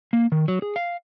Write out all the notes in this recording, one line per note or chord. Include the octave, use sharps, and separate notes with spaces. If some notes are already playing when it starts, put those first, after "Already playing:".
A#3
D#3
F#3
G#4
F5